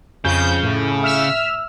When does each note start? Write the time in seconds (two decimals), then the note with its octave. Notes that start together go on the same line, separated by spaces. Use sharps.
0.25 F2 C#3 G6
0.63 A2
1.03 E5 E6 F6